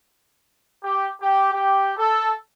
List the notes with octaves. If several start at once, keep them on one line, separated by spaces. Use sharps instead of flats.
G4
G4
G4
A4